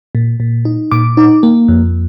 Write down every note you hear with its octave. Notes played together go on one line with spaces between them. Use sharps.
A#2
A#2
D#4
A#2 D6
D#4
A#3
F2